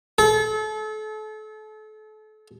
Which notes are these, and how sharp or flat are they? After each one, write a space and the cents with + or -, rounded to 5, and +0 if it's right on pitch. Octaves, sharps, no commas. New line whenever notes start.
A4 -35